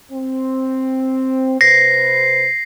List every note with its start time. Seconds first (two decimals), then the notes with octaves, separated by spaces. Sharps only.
0.11 C4
1.61 C3 B4 C5 A#6 C7